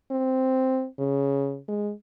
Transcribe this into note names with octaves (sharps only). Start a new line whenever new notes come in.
C4
C#3
G#3